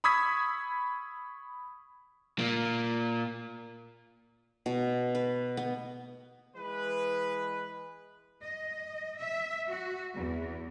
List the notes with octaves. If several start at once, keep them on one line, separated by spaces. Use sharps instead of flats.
B5 C#6 D#6 E6 G#6 B6
A#2 A#3
B2
B4
B3
E3 G#3 B4
D#5
E5
F#4
E2